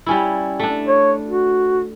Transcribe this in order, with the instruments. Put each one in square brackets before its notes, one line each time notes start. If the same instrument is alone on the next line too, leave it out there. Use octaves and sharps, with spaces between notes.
[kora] G3 C#4 E4
A3 D4
[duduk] C#5
F#4